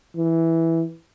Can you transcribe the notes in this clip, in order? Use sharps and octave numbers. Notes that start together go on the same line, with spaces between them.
E3